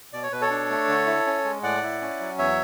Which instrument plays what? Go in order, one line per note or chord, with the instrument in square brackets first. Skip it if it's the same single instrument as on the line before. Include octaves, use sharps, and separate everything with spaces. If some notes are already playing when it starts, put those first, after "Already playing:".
[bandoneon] B2 D5
C#5
B2 B4
A4 C#5
D4
A3
D3
E4
C#4
G#3
A2 D5 F#5
E4
C#4
F#3
E2 C#5 E5